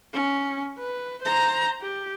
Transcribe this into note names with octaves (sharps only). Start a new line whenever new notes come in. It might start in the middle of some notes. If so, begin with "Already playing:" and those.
C#4
B4
C5 A#5
G4